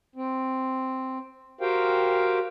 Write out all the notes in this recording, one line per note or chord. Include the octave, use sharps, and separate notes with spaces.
C4
F#4 G4 A#4 C5 F5 G5